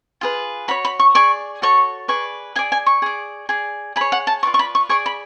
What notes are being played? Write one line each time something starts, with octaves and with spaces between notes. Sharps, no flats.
F4 G#4 B4
F#4 C#5 B5
B5
C#6
G#4 D5 C#6
F#4 A4 C#5 C#6
G#4 B4 D5 C#6
G#4 D5 G#5
G#5
C#6
G#4 D5
G#4 D5
G#4 B5
C#5
F#5
A5
F4 B4 D5 C#6
C#6
B5
C#6
G#4 D5 C#6
B5